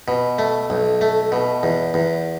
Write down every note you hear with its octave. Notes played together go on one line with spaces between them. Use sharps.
B2
A3
B1
A3
B2
E2
E2